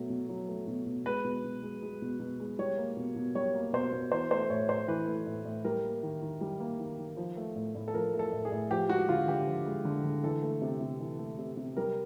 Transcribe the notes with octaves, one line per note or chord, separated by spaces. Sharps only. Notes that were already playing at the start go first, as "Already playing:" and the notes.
Already playing: B2 F#3 A3
B2
F#3
A3
B2
B2
G#3 B4
B2
B2
G#3
G#3
B2
B2
G#3
G3 C#5
A#3
B2
B2
G3 C#5
A#3
B2 C5
B2
E3 C5
A3 C5
A2 C#5
A2 C5
E3 B4
A3
A2
A2
G3 A#4
A#3
D#3
D#3
G3
A#3
D#3
D#3
F3
A3
A2
A2
A4
F3 A#4
A3
A4
A2
G#4
A2
F3 G4
G#3 F#4
D3 F4
D3 G4
F3
G#3
D3
D3
E3 A4
A3
C3
C3
E3
A3
C3
C3
G3 A#4